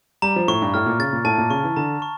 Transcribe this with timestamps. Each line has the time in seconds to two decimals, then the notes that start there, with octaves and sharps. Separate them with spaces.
0.22 G3 A#5
0.36 F3
0.48 A2 C#6
0.62 G2
0.74 A2 F6
0.86 A#2
0.99 C#3 A6
1.13 A#2
1.25 A2 A5
1.38 A#2
1.50 C#3 C#6
1.64 E3
1.77 D3 A#5
2.02 C#6